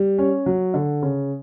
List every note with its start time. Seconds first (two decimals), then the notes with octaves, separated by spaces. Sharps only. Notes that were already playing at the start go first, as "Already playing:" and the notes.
Already playing: G3
0.18 C#4
0.46 F#3
0.74 D3
1.02 C#3